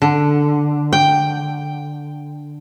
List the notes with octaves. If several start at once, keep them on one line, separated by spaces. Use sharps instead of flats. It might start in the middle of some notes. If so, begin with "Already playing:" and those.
D3
G5